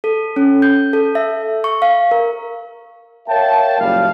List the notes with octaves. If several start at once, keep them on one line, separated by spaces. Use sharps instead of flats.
A4
C#4
G6
A4
E5
C#6
F5
A#4
A#4 C#5 E5 F5 G5 A5
F#1 A#2 G3 F5